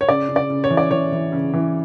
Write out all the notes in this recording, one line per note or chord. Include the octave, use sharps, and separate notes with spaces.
C#5
C#3 D5
C#3
D5
C#3
C#5
E3
D5
E3 C#5
E3
C#3
E3